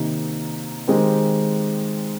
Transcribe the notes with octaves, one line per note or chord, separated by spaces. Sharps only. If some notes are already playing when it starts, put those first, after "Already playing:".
Already playing: C3 D#3 A#3 D#4
D#3 G#3 C4 G4